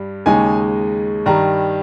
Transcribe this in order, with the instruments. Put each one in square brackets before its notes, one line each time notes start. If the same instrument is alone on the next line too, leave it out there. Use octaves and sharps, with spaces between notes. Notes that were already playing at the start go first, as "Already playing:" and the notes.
Already playing: [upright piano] G2 G3
D#2 C#3 G#3 D#4 G#5
G2 D#3 G3 A#5